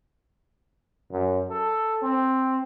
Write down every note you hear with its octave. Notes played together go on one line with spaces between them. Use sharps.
F#2
A4
C4